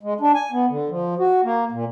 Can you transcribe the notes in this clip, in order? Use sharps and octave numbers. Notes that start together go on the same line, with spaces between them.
G#3
D4
G#5
B3
D3
F3
F#4
A#3
A#2